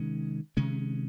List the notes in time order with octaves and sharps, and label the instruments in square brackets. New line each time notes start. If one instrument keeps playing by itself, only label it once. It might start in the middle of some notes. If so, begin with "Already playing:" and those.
Already playing: [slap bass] C3 D#3 G#3 C#4
C3 D#3 G#3 C#4